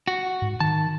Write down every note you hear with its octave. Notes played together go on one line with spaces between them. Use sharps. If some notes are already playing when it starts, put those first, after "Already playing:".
F#4
G#2
D#3 A5